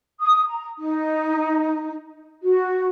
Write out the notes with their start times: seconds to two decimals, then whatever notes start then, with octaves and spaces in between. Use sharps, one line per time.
0.21 D#6
0.48 A#5
0.78 D#4
2.44 F#4